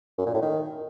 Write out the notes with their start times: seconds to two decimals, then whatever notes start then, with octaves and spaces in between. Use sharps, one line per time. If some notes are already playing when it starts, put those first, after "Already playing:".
0.18 F#2
0.26 A#2
0.34 A2
0.42 D#3